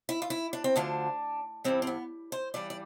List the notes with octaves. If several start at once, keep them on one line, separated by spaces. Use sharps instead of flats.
E4
F4
E4
D4
C4
D2 D3 F3 D4
G2 E3 G3 C4
C4
B3
C5
G2 E3 G3 D5
D5